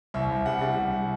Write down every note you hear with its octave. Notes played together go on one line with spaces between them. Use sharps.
C2 E5
C2
G3 F#5
G3
C2